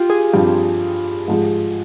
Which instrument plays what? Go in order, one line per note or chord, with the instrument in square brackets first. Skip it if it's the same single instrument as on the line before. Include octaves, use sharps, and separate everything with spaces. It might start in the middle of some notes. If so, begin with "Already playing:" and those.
Already playing: [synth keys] F4 G4
G#4
[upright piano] G2 F3 C4 [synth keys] G4
[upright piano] G#2 F3 G#3